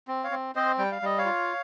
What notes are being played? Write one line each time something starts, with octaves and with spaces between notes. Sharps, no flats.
C4
C#5 F5
C4
C4 C5 D#5
G3 G5
F5
G3 D#5
C#5 F5
F4